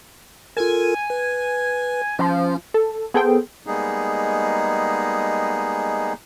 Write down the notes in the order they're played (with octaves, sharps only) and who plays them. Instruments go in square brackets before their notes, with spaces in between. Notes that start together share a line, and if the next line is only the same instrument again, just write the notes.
[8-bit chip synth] F4 A4 A#4 [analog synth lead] G#5
[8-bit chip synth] B4
[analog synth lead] F3 [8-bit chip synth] C#4
[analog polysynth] A4
B3 G#4 A4 C5 G5
[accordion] G3 G#3 A#3 B3 D#4 G#4